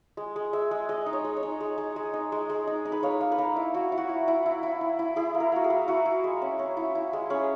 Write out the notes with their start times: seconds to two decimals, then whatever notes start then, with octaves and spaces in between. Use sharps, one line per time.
0.17 G#3
0.36 G#3
0.53 G#3 E5
0.71 G#3
0.89 G#3 D#5
1.06 D#4
1.13 C#5
1.24 G#3
1.37 C#5
1.43 D#4
1.61 G#3
1.78 G#3
1.96 G#3
2.14 D#4
2.32 G#3
2.50 G#3
2.67 D#4
2.85 D#4
2.92 B4
3.03 A#3 C#5
3.21 A#3
3.32 B4
3.38 A#3 A#4
3.56 E4
3.74 E4 F#4
3.92 E4
3.98 F#4
4.09 E4
4.28 E4
4.46 E4
4.63 E4
4.81 E4
4.99 E4
5.16 E4 G#4
5.34 A#3
5.40 A#4
5.52 A#3 F#4
5.64 G#4
5.70 A#3
5.88 E4 F#4
6.06 E4
6.24 G#3
6.42 C#4
6.59 C#4
6.77 E4
6.95 E4
7.13 G#3
7.30 C#4 G#4